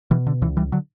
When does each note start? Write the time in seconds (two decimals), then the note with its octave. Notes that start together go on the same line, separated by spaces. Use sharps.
0.11 B2 E3
0.27 D3
0.42 C#2 E3
0.57 E3 G3
0.72 D3 F#3